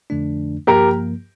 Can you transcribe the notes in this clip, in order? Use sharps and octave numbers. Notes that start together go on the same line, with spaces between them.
F2 D3 F3 A3 D4
G2 F3 A#3 G4 A#4